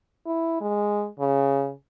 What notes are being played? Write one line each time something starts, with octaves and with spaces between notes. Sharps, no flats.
E4
G#3
C#3